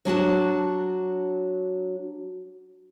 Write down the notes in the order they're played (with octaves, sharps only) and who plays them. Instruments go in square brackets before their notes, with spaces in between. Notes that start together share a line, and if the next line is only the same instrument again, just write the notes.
[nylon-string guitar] F#3 D4 F#4 A5